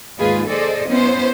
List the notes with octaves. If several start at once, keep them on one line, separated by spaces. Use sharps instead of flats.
D#2 G#2 G#3 F4 G#4 B4
G#4 A4 C5 D5 D#5
B3 C#4 E4 C5